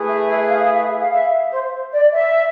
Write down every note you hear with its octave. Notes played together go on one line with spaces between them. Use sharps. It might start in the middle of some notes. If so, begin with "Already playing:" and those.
Already playing: A3 E4 G#4 B4
E5
E5
E5
F5
E5
F5
E5
C5
D5
E5